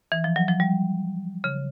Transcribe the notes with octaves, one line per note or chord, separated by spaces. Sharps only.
E3
F3
F#3
F3
G3
C#3